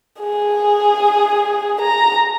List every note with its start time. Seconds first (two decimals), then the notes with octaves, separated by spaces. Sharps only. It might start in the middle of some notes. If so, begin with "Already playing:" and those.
0.19 G#4
1.80 A#5